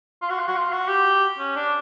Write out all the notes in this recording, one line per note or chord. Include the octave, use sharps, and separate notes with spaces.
F4
F#4
F4
F#4
F4
F#4
G4
C#4
D4